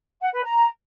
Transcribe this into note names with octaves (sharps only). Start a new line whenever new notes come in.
F#5
B4
A#5